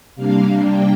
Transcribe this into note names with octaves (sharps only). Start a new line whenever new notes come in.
C3 G3 A#3 D4 F5
G5